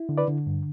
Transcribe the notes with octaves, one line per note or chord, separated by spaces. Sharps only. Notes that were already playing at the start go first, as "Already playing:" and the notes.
Already playing: E4
D3
B4 D5
D3
G2